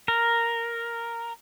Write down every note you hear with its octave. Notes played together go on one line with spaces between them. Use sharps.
A#4